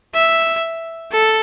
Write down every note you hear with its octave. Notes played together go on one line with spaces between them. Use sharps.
E5
A4